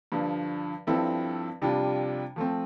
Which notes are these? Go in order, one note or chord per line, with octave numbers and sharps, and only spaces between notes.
G2 D3 F3
G2 F3 C4 E4 A4
F2 C3 G3 D4 F4
F3 A3 C4